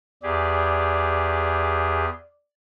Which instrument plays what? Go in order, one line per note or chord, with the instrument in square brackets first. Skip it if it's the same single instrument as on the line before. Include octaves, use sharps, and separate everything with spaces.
[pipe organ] E2 G4 G#4 [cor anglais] D5